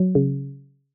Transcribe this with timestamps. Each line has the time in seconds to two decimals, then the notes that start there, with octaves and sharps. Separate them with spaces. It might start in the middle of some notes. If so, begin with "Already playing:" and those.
Already playing: F#3
0.15 C#3